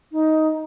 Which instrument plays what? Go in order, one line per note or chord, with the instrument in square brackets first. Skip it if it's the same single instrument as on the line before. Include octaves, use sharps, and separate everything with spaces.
[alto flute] D#4